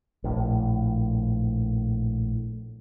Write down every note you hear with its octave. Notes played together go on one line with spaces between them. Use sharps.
A#1 A2